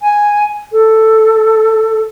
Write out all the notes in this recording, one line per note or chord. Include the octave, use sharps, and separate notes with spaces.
G#5
A4